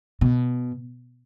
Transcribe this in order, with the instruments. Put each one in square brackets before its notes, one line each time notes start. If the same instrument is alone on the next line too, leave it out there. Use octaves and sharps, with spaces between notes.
[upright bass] B2